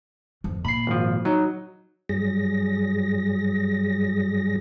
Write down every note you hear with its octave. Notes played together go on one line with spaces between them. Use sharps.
G1 F2
A#2 B5 C7
G#1 F3
F#3 D#4
G2 F#3 G3 G#4 A#6